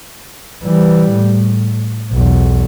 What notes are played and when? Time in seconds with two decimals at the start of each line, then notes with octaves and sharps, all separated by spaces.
0.63 E3 G3
1.12 A2
2.12 B1 E2